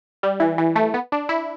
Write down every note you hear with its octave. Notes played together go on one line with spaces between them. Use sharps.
G3
E3
E3
A3
B3
D4
E4